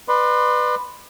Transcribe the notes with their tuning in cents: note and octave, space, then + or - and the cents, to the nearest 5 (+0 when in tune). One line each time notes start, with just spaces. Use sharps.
B4 +0 D5 +40 C6 +0